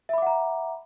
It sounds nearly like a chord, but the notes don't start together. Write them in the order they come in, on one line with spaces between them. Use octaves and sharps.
E5 B5 D6 F#5 A#5